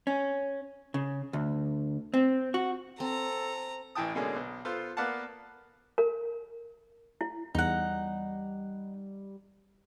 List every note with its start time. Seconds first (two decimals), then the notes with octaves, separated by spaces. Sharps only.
0.07 C#4
0.94 C#3
1.33 D2
2.14 C4
2.54 F#4
3.00 C4 A4 A#5
3.95 A1 E3 E4 G5 A5 D#6
4.15 B2 D3 G#3 A#3 C#4 D4
4.36 B1
4.65 B3 F4 A4 C5
4.97 A#3 B3 D5 F5 F#5 A5
5.98 A#4
7.21 E4
7.55 E2 G3 D#4 F#5